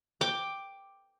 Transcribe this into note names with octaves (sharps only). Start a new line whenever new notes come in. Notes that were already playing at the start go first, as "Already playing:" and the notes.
G5 D6